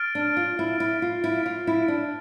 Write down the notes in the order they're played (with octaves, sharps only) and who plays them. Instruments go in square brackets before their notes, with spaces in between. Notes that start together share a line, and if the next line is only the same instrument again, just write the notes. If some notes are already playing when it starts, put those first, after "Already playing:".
Already playing: [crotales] F6 A6 D7
[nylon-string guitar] D4
F4
E4
E4
F4
E4
F4
E4
D4